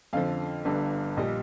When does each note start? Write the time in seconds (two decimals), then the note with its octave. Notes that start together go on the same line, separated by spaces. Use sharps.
0.13 F2 D3 F3 F5
0.65 G1 G2 D3
1.17 A#1 A#2 G3 D#5